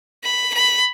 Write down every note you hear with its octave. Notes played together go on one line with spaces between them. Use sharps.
B5
B5